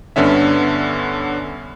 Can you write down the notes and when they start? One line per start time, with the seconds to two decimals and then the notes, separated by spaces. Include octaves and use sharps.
0.16 G2 D3 B3 C#4 E5